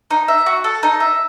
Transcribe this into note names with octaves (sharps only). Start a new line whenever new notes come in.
D#4
E5
F#4
A4
D#4
E5